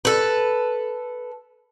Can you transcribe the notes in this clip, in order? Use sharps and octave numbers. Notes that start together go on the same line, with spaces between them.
A4 B4